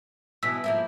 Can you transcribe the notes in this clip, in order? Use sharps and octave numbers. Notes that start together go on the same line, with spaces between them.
B2 E3 E6 B6
F3 A#3 E4